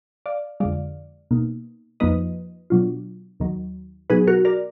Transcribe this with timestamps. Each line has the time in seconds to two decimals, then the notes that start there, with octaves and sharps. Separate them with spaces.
0.26 D5 F5
0.60 F2 D3 G#3 D5 F5
1.31 B2 A#3 D#4
2.00 F2 F3 A#3 D#4 B4 D#5
2.70 B2 F#3 D4 F4
3.40 D#2 D#3 F#3
4.10 B2 F#3 B3 D#4 G#4 B4
4.27 F#4 A#4
4.45 A#4 D5